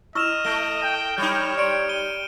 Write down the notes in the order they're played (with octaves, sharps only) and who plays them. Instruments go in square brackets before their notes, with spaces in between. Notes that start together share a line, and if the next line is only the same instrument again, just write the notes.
[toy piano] E4 C#6 E6 [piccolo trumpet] D#5 [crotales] F6 E7 F7
[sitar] A3 [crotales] D7 G7
[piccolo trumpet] G5 [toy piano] A5
[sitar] G3 D#4 [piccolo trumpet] C#5
[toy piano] D5 C6 C#6 [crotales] C#7 D7
[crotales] D#7 G7